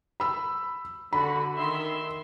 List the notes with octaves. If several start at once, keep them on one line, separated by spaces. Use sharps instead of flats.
B5 E6
D3 F#4 B5
D#3 E5 C6